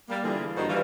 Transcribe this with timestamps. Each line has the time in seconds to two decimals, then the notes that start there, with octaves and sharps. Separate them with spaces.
0.09 G3 A#3
0.24 D3 E3 G3 F4 G#4
0.56 G2 D#3 D#4 F#4 A4 C5
0.68 E3 G3 F4